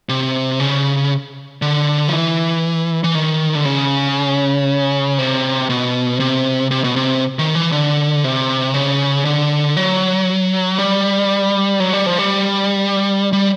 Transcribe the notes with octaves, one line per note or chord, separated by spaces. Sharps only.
C3
C#3
D3
F3
E3
E3
D#3
D3
C#3
C3
B2
C3
C3
B2
C3
D#3
E3
D3
C3
C#3
D3
F#3
G3
F#3
G3
F3
G3
G3